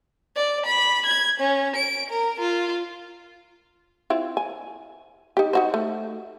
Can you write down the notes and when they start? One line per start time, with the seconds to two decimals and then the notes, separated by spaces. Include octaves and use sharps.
0.36 D5
0.66 B5
1.05 G#6
1.40 C#4
1.76 D7
2.10 A#4
2.39 F4
4.10 C4 E4 F4
4.37 G#5
5.37 D#4 G4
5.53 D#4 F#4 C5
5.74 A3